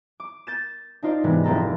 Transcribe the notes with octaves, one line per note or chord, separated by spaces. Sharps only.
D6
G6 A6 E7
D4 D#4 F4 C5 D5
G#2 C3 E3 G#3 B3 E4
F1 C4 A4 A#5